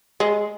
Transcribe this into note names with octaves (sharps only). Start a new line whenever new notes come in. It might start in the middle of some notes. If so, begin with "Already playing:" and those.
G#3